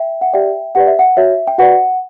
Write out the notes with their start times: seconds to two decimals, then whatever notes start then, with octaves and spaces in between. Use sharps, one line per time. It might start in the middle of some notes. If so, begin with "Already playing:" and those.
Already playing: E5 G5
0.21 F#5
0.33 G4 D5 E5 G5
0.75 G4 B4 D5 F#5
0.87 E5
0.99 F#5
1.17 F#4 C#5 E5
1.47 G5
1.58 F#4 B4 D5 F#5